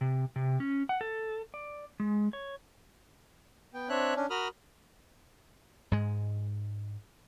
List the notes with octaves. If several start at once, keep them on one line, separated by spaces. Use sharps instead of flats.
C3
C3
C#4
F#5
A4
D5
G#3
C#5
B3 G5
C4 D4 C#5 E5 F#6
C#4 D4
F#4 A#4 B5 D#6 F6
G#2 G#3